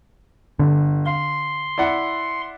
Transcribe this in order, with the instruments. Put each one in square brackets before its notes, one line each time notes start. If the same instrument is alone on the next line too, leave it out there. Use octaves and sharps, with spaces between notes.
[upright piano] G1 [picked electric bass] D3
[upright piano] F5 [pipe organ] C6
[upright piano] E4 D5 F#5